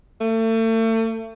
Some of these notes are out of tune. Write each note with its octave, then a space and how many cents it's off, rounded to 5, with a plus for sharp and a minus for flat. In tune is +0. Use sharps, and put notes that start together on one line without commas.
A3 +35